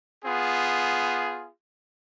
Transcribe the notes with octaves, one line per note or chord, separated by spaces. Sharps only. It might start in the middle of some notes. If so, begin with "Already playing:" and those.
B3 F4 G#4